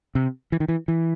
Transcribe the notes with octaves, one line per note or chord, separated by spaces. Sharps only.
C3
E3
D#3
E3
E3